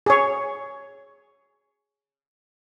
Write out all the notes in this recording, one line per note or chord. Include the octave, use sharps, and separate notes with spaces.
G#4 C#5